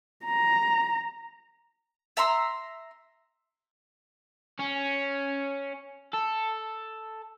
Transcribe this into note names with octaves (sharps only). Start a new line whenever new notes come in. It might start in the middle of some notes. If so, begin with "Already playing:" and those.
A#5
E5 A#5 C6 E6
C#4
A4